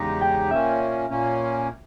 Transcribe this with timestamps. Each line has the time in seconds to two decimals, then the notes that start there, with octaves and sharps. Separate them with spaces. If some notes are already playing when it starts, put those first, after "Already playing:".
Already playing: E2 C#3 G#3 D#4 G4 A#5
0.21 G5
0.50 A#2 A#3 C#4 E5
1.10 A#2 A#3 C#4